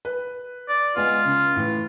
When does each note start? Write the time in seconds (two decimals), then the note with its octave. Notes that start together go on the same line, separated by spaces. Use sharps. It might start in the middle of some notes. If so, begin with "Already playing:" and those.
0.05 B4
0.69 D5
0.96 G#3 B3 F4
1.25 C#3
1.56 A2 E3